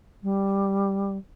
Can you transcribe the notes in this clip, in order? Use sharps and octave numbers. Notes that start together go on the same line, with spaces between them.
G3